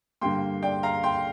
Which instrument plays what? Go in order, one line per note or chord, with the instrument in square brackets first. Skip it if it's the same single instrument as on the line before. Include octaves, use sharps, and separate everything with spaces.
[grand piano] G2 D3 G3 A#3 G5 C6
D5 G5
F5 A#5
G5 C6